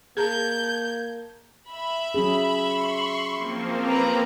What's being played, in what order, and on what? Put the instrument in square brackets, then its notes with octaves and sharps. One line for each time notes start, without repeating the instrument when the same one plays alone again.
[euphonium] A#3 [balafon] G#4 [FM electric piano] A5 A#5 G#6 [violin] G6
[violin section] E5 B5
[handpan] F#3 C#4 G#4
[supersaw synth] C6 C#6
F3 A#3 C4
[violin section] B4 A#5